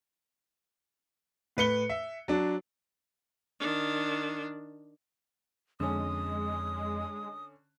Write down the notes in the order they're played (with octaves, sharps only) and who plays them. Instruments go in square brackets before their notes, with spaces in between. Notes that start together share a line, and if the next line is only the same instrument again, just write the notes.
[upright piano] A2 B4 C#7 G7
E5
F#3 D4
[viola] D#3 D4
[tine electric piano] F2 [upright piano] D3 C#4 [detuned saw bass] G#3 [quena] D#6